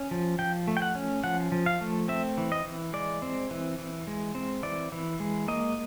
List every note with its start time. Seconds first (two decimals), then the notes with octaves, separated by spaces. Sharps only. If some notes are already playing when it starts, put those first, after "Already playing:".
Already playing: C#4
0.11 F3
0.39 F3 G5
0.68 A3
0.77 G5
0.82 F#5
0.95 C#4
1.24 F3 F#5
1.52 F3
1.66 F5
1.81 A3
2.08 C4 E5
2.38 E3
2.52 D#5
2.66 E3
2.93 G#3 D5
3.22 C4
3.51 E3
3.79 E3
4.07 G#3
4.35 C4
4.63 E3 D5
4.92 E3
5.20 G#3
5.48 A#3 D#5